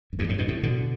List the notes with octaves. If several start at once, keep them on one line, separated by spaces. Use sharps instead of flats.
F#2
E2 G2
F#2 A2
G2 B2
A2 C3
B2 D3